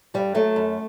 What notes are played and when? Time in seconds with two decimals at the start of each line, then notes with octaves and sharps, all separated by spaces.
0.14 G2 G3
0.35 F#3 A3
0.56 F#2